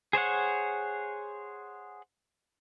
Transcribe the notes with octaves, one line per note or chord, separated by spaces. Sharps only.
G#4 C5 C#5 F#5